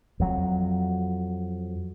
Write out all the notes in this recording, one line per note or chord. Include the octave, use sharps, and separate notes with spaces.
F2 F#3